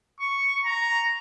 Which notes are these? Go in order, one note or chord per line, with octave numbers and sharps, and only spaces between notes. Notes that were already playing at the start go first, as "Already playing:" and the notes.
C#6
A#5